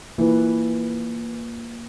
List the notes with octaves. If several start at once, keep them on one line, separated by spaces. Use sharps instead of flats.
E3 A#3 F4 B4